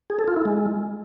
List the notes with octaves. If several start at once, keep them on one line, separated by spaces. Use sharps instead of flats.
G#4
A4
F4
E4
G#3